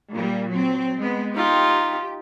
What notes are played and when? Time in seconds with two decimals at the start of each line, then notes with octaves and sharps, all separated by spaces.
0.12 A#2 G3 A#3
0.49 F#3 C4
0.98 G#3 B3
1.35 D#4 F4 G4